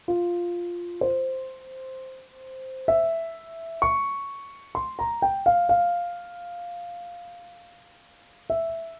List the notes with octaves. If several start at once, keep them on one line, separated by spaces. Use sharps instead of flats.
F4
C5
E5
C#6
C6
A#5
G5
F5
F5
E5